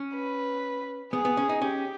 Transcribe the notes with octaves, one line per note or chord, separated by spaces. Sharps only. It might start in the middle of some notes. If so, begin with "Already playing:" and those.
Already playing: C#4
B4
B3 G#4
B3
C#4
D#4
C#4 G4